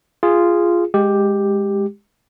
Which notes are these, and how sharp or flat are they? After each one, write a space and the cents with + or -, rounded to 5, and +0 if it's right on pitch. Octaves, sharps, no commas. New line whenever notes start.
F4 -10 G#4 -10
G#3 -10 G4 +5